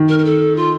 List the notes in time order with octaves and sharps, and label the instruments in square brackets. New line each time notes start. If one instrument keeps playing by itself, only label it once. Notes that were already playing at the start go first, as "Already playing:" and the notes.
Already playing: [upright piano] D#3
[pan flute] A#4
A#4
A4
F4